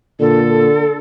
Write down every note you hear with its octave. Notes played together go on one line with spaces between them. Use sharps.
A#2 D3 A4